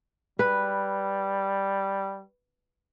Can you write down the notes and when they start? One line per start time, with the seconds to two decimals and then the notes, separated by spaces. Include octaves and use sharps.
0.39 G3 B4